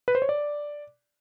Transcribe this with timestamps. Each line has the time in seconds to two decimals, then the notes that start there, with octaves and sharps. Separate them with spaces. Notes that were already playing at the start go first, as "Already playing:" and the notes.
0.08 B4
0.15 C5
0.22 C#5
0.29 D5